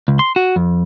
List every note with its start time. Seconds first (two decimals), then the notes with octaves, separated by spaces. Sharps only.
0.08 C#2
0.19 C6
0.36 F#4
0.56 F2